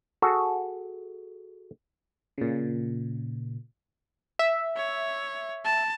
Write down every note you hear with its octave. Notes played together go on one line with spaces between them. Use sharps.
F#4 G#4 A4
A#2 C#3
E5
C#5
A5